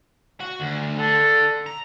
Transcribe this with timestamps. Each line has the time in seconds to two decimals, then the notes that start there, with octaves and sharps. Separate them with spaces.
0.40 F#4
0.60 D2
0.98 D3 A4
1.66 A#5